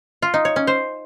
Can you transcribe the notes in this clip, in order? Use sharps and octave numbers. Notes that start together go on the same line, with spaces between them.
F4
D#4
C#5
C#4
C5